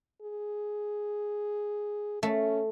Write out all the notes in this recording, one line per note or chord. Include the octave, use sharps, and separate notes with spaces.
G#4
A3 C#4